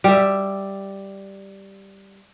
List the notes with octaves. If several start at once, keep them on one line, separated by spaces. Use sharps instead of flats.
G3 E5